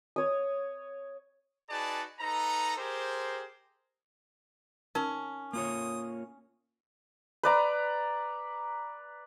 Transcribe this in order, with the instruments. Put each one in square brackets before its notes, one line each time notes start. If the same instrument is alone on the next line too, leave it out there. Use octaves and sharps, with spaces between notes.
[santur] C#5 D#6
[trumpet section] D#4 F#4 G#4 B4 D5 A5
D#4 A4 B4 A#5
G4 G#4 A#4 C5
[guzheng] C#4 [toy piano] D#4 A#4
[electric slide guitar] A#3 F4 C#5 [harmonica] D#6
[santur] B4 D5 A#5